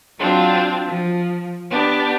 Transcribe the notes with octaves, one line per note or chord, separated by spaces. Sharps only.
F#3 C4 D4 F4
F3
B3 D4 G4